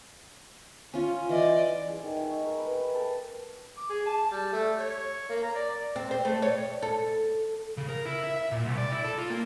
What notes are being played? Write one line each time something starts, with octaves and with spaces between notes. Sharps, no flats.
C#4 F4
E3 D5 D#5
G#4
D#3
E5
C#6
A#4
B4
G5
A4
D6
G#4
A5
G3
A3
C#5
A#3
A#5
D5
C4
C5
A3
C#5
A4
C#3
A#4
E4
E5
E5
A#2
C2
D5
E4
A4
F4
A#3